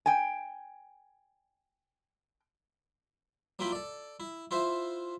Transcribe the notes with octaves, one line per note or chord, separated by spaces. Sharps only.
G5 G#5
F#3 A#3 E4 F4 G5 B5
A4 D5
E4
E4 F4 C5 E5